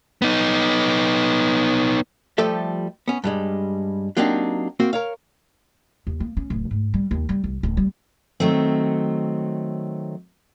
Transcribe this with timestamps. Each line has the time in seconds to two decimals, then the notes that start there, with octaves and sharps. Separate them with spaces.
0.22 B3 D#4
2.38 F3 G3 A3 G4 A4 E5
3.08 B3 C#4
3.24 G2 G3 G#3
4.17 F#3 A#3 C4 D4 D#4 G4
4.80 A#3 C4 F#4
4.93 A#4 C#5 F5
6.07 D#2
6.20 A#3
6.37 C#4
6.50 D1
6.71 G#2
6.94 G3
7.11 D#2
7.29 G3
7.44 C2
7.63 D1
7.77 G3
8.40 D#3 F#3 A3 C4